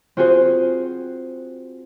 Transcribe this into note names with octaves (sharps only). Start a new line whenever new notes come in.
C4 F4 F#4 G#4 C5